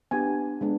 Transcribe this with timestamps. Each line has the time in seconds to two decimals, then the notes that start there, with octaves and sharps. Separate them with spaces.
0.11 B3 D4 G4 G#5
0.61 G#3 B3 D4